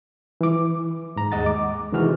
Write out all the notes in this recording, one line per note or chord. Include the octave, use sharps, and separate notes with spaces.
E3 D6
G#2 A#5
D#2 G#3 D#5 F#5 A6
D6
C3 D#3 E3 G#3 F#4 F6